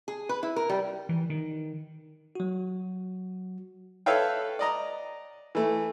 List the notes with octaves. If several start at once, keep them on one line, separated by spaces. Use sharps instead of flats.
G#4
B4
E4
A#4
G3
E3
D#3
F#3 F#4
A4 B4 C#5 E5 F5 G5
D5 D#5 A#5
E3 A3